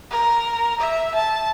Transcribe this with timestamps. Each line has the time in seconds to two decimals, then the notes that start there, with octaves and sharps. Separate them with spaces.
0.10 A#4
0.80 E5
1.14 A5